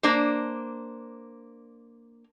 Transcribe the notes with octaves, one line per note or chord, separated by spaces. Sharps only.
A#3 D4 C5